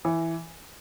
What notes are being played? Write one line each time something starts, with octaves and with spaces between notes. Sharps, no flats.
E3